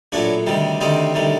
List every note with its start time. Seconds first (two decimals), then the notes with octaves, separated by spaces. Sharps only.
0.12 A#1 A2 F#3 D4 F#4
0.46 D2 C3 D#3 G3
0.81 D2 C3 D#3 G3 C4 D#4
1.14 D2 C3 D#3 G3